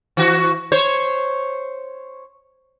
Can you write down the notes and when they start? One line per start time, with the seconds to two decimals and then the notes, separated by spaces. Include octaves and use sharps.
0.17 E3 F#4
0.72 C5 C#5